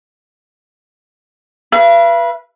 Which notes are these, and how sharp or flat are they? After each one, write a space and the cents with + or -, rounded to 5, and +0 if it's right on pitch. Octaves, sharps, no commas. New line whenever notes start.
B4 -25 F5 -45